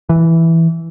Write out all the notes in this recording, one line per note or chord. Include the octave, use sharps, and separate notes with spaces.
E3